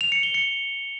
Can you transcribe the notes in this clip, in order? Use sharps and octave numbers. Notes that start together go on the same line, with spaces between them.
F7
C#7
G7
C#7